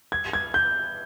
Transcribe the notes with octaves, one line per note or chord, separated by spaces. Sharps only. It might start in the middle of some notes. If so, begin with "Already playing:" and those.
G#6
G#6
G6